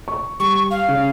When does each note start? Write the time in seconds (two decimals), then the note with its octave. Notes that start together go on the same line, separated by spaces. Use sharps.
0.08 C#6
0.40 G3 C#6
0.71 F5
0.88 C#3